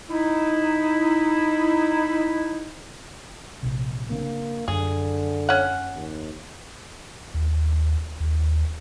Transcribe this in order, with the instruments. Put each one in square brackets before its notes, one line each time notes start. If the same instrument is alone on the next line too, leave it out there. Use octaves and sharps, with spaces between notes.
[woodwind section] D#4 E4
[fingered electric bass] A#1 C3
[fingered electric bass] C#3 C4 D4 [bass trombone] A#3
[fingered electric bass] F#2 [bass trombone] D3 [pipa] G#4
[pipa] C#4 F#5
[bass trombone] D#2
[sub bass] D#2
D#2